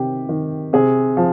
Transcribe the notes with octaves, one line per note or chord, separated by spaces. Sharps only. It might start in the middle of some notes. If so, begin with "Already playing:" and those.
Already playing: C3 D#3 G4
D#3
C3 G#4
F3